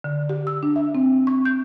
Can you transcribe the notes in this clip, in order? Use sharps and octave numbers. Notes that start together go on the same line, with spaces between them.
D3
G4
E6
D4
E5
C4
C#6
G6